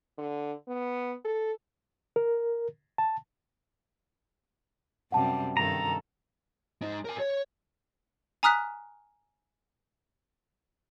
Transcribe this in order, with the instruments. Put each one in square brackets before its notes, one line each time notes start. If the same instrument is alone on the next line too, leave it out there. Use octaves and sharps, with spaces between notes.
[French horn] D3
B3
A4
[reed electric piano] A#4
A5
[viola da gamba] F#2 C3 G3 [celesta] F#5 A5
[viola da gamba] G2 D#3 A4 [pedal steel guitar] A#5
[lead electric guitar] G#3 D#4
A#4 G#5
C#5
[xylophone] G#5 A#5 D#6 F6 F#6 B6